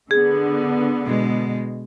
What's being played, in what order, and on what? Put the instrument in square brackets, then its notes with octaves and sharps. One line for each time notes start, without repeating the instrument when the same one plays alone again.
[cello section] D3 B3 [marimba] G#4
[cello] B2 G#3